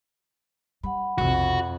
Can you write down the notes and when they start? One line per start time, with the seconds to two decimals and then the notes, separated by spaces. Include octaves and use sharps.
0.84 G3 F#5 B5
1.18 B1 F2 C3 F#4